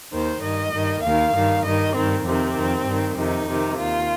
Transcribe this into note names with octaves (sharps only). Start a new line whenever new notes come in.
D#2 D#3 C5
G2 D#3 D#5
G2 D#3
D#2 D#3 F5
G2 D#3
G2 D#3 D#5
G2 D#3 C4
F2 C3 D#3 C4
F2 D#3
G2 D#3
F2 C3 D#3 D#4
F2 C3 D#3
D#2 D#3 F4